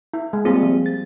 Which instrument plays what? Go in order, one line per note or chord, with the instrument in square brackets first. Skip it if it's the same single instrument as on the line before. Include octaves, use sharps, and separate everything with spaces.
[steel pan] E4
G#3
[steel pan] G3 A#3 F4 [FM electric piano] C4 G#4
[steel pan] F3
[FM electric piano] A6